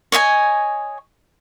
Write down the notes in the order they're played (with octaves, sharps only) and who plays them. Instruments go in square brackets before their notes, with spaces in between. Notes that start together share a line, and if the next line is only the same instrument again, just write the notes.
[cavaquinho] C#5 D#5 E5 G#5